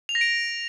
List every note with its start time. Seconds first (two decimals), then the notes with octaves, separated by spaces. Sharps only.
0.09 F7
0.15 A#6
0.21 D7